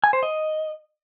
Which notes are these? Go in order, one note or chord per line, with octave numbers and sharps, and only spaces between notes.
G#5
C5
D#5